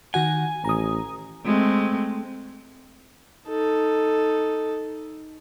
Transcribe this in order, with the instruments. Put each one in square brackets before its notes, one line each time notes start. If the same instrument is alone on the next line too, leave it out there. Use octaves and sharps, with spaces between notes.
[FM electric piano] D#3 F#4 F#5 [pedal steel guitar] G#5
[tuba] A1 [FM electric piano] A#5 D#6
[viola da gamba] G#3 A3 C4
[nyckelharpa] D#4 A4